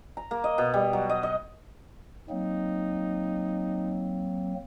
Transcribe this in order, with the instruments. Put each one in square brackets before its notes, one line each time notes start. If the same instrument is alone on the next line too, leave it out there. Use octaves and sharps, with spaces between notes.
[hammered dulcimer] A#5
A#3
D#5
B2
G3
F#3
D#5
D#5
[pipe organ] F#3 A#3 C4 [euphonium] D#4